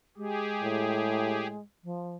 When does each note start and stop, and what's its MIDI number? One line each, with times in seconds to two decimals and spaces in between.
0.17 1.61 56
0.17 1.47 67
0.17 1.47 68
0.63 1.59 45
1.84 2.16 53